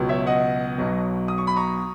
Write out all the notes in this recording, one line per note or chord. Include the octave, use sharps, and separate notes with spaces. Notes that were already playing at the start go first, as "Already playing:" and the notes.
Already playing: C#2 B2 F#3
C#5 E5
D#5 F#5
B1 B2 F#3
D#6
C#6
B5
A#5 C#6